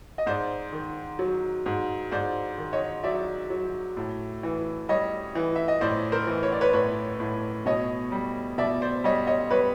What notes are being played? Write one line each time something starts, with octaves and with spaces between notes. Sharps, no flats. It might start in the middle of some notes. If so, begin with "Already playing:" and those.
D#5
G#2 C5 D5
D#3
F#3
G#2
G#2 C5 D5
D#3
C#5 D#5
F#3 D5 E5
F#3
A2
E3
G3 C#5 D#5
E3
E5
D#5
A2 C5 D5
A#4 C5
E3
C#5
D5
B4 C#5
A2 B4 C#5
A2
B2 C#5 D#5
G3
B2 D5 E5
C5 D5
G3 C#5 D#5
C#5 D#5
G3 B4 C#5